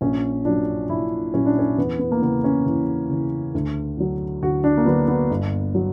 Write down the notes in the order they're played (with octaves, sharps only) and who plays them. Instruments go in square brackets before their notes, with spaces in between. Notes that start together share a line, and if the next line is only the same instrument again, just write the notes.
[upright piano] A#1 C#4
A#2 F#3 D4
A#1 E4
A#2 F#3 C#4
D4
C#4
E2 B3
B3
A#3
C#3 E3 B3
C#4
E2 E4
C#3 E3
D2
D3 F#3
D2 F#4
D4
A#3
D3 F#3 B3
B3
G1
F#3